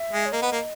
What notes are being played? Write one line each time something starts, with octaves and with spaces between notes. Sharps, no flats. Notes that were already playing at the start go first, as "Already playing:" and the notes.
Already playing: E5
G#3
C#5
A#3 D#5
B3
A#3